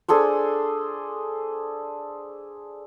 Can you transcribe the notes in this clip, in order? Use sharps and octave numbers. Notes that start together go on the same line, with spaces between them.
D4 G#4 A4 C5